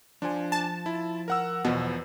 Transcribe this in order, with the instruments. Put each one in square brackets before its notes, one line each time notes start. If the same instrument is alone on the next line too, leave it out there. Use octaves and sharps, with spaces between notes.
[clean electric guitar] F3 C5 [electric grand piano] D4 G#5
[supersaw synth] A5
[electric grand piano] E4
A#4 F#5 E6
[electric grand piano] E2 F3 [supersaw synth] B2